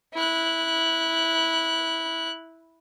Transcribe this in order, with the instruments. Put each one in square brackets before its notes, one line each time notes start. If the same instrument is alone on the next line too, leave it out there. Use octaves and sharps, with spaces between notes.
[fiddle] E4 F#6